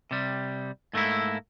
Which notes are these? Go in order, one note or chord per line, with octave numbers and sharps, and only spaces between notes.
C3 G3
G#2 A3 A#3 E4